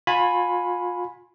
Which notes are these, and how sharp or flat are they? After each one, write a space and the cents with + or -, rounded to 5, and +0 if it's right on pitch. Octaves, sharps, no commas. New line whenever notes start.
F4 +30 G#5 +0 B5 +0